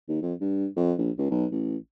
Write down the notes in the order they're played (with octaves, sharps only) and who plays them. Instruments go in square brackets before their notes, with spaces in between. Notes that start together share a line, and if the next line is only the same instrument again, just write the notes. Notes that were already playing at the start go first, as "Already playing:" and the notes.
[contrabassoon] D#2
F2
G2
F2
A#1
C#2
B1
A1